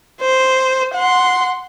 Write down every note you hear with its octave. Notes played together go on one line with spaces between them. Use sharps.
C5
F#5 C6